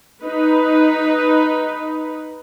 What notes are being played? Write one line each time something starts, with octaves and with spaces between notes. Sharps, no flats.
D#4 B4